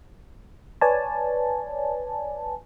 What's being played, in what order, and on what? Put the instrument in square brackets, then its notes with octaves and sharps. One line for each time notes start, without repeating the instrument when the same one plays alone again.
[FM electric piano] B4 C#5 D5 G#5 A5